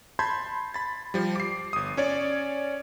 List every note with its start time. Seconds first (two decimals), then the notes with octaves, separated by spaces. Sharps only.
0.19 A5 B5 C6 G6 G#6
0.74 B5 A6
1.14 F3 G3
1.36 D6 C7
1.73 G1 D#6
1.97 C#4 C#5 D5